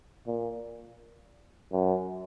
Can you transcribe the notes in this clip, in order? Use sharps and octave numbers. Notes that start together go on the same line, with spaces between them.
A#2
F#2